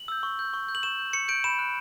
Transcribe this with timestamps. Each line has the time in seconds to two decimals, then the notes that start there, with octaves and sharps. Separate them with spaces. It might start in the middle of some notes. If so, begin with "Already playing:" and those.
Already playing: F#7
0.08 E6 G6
0.23 C#6
0.39 G6
0.53 C#6
0.69 G6
0.75 F#7
0.83 C#6 E7
0.99 G6
1.13 C#6 C#7
1.28 G6 D7
1.44 B5 E7
1.59 F#6